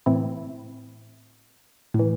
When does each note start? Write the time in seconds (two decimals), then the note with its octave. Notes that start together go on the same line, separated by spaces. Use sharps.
0.06 A2 E3 C4 E4
1.94 A2
1.99 E3